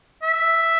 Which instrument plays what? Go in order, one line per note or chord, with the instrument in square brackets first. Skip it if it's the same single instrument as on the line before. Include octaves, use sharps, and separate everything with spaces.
[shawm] E5